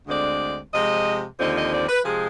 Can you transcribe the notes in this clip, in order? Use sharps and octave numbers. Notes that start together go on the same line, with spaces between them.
D2 D3 G#3 C4 D5
C3 F3 G#3 D#5
D#2 D3 F3 C4 D#5
D#5
D5
B4
C3 F3 G#3 G#4